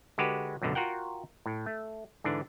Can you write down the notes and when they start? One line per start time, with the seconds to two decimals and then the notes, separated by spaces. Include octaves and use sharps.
0.18 D3 G#3 F#4 G4 B4
0.62 C#2 F#2 B2 D3
0.75 F4 F#4 A#4 F#5 G5
1.46 A2
1.66 A3
2.24 G#2 D3 E3 D4